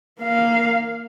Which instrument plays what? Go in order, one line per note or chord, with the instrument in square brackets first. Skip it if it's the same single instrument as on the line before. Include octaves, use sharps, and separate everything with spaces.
[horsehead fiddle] A#3 F5